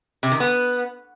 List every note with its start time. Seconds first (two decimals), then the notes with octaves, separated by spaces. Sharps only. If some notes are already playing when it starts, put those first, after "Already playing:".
0.23 C3
0.32 D#3
0.40 B3